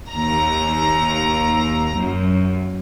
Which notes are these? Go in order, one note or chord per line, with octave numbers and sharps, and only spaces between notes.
D#2 A#5
F#2